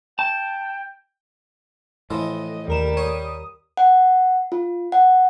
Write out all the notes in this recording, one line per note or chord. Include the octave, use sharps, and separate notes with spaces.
G5 A5
A2 E3 F3 D#5
D#2 G3 A#4 E7
C#5 D#6
F#5
F4
F#5